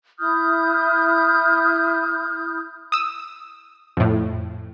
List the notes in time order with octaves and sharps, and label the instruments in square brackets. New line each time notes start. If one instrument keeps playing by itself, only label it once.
[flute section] E4 D#6 F6 G6
[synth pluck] D#6 E6
F2 A2